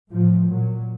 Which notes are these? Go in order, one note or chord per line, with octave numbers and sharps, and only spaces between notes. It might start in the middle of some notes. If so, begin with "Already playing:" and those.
A2 F3
A#2 F#3